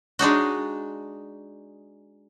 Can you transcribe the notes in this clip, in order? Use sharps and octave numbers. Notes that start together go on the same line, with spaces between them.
G#3 D4 D#4 F#4